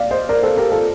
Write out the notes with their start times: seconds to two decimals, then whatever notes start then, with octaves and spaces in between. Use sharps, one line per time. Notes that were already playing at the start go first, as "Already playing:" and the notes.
Already playing: D5 F5
0.11 C5 D#5
0.29 A#4 D5
0.43 A4 C5
0.57 G4 A#4
0.72 F4 A4